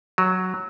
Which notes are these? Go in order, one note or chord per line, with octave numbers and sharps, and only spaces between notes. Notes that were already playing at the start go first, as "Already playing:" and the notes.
F#3